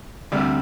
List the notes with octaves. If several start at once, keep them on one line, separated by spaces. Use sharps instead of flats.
D2 C3 G3